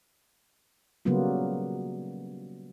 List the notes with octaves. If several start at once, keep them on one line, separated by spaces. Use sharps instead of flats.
C#3 F#3 G3 A#3 B3 F4